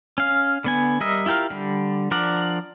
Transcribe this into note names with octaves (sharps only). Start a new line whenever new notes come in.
C#4 F5
D3 B3 G#5
G3 A#4 D#5 E5
E4 F4 G4 A#4 F5
D3 G3
F3 D4 A#4 D5 F#5